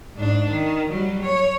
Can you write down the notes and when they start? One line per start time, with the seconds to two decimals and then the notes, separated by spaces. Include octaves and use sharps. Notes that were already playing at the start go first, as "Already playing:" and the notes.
0.16 G#2 D4
0.51 D#3
0.89 F#3 G3
1.23 C#5